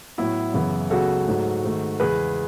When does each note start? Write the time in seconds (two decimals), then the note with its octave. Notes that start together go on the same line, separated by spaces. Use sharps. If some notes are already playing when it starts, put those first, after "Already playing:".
0.18 A2 F#3 B3 E4
0.54 F#2 C#3 E3 B3
0.91 C#2 C#3 F#3 B3 F#4 A4
1.27 G#2 F#3 A3
1.64 G#2 D#3 A3
2.00 E2 C#3 G#3 G#4 B4